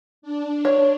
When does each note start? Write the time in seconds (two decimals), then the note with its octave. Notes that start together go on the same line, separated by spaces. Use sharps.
0.22 D4
0.65 C#5